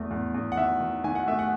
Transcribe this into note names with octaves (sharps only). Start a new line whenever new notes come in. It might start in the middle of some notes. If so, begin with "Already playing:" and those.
Already playing: E2 A3
E2
E2
F#5
D#3 E5
D#3
D#3 G#5
F#5
A3 E5
F#5